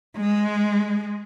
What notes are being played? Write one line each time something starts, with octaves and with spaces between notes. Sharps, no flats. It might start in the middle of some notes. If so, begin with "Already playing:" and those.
G#3